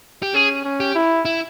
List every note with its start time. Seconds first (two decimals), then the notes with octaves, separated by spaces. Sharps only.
0.23 G4
0.34 C#4 G#4
0.64 C#4
0.80 G4
0.95 E4
1.25 E4